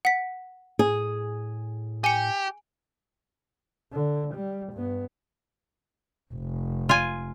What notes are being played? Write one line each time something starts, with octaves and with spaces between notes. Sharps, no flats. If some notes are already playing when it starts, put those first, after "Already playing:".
F#5 B6
A2 G#4
G4 G#5 C#7
D3
G3
G2 B3
F1
F4 G#5